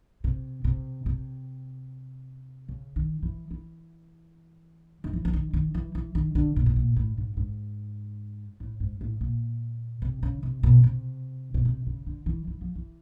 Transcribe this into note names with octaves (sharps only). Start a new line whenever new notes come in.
C3
C3
C3
C#3
D#3
E3
E3
D#3
E3
E3
D#3
D#3
E3
E3
D#3
D3
A#2
A2
A#2
A2
G#2
G#2
A2
G#2
A2
A#2
C3
C#3
C3
B2
C3
B2
C3
C#3
D3
E3
E3
F3
E3